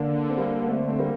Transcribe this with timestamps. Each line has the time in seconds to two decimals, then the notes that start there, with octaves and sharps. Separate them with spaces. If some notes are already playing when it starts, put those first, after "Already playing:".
Already playing: D3 A#3 D4
0.30 C4
0.37 G3 A#3
0.62 A#3
0.68 A3 C4
0.89 C4
0.99 G3 A#3